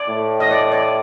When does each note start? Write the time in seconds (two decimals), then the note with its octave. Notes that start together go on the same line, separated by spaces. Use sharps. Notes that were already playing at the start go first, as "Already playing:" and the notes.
Already playing: D5
0.09 A2
0.40 D#5
0.51 D5
0.72 D5